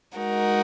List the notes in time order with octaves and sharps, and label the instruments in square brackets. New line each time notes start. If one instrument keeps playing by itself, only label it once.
[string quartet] G#3 D#4 F#4 A#4